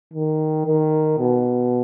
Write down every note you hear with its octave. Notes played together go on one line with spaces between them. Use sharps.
D#3
D#3
B2